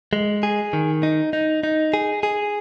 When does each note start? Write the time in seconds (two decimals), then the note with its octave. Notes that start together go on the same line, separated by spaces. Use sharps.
0.13 G#3
0.43 G#4
0.73 D#3
1.03 D#4
1.33 D#4
1.63 D#4
1.94 G#4
2.23 G#4